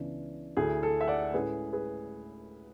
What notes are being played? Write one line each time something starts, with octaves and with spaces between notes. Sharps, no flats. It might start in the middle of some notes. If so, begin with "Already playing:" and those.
Already playing: C#2 C#3 E3 B3 D4
D2 D3 A3 E4 G#4
A4
E5
D5 F#5
A2 G#3 C#4 E4 G#4 B4
G#4 B4